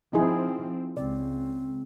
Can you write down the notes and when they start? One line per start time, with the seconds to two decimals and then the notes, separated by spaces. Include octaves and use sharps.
0.13 F3 C4 D#4 E4 G#4
0.97 C#2 C4 D5